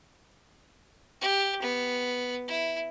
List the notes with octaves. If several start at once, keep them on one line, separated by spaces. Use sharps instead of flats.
G4
B3
E4